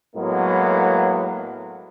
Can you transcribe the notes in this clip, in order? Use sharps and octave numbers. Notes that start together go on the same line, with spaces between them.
A2 F#3 G#3 A#3 B3